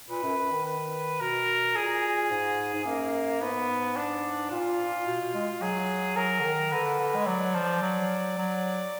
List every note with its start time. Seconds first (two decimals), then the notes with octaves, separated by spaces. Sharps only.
0.09 A#2 B4
0.24 F#2
0.37 F#2
0.51 D#3
0.65 B4
1.20 B2 A#4
1.75 A#2 G#4
2.31 G#2
2.74 G#2
2.85 F#2 A#3
3.41 G#2 B3
3.96 D4
4.51 A#2 F4
5.06 B2
5.20 B2
5.34 G#3
5.61 F#3 G#4
6.16 F#3 A#4
6.40 D3
6.44 D#3
6.72 D3 B4
6.99 D3
7.15 G#3
7.27 F#3 D5
7.55 F3
7.82 F#3
8.38 F#3